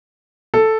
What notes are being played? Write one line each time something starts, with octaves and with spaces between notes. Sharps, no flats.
A4